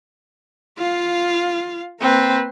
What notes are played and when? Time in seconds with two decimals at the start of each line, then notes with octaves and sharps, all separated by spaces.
0.78 F4 F5
2.01 A#3 C4 B4